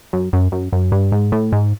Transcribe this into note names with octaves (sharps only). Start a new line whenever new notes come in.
F#2
F#2
F#2
F#2
G2
G#2
A2
G#2